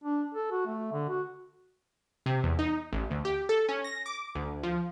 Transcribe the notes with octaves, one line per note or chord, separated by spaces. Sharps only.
D4
A4
F#4
A3
D3
F#4
C3
E2
D#4
A1
D2
G4
A4
C#4
A#6
D6
D2
F3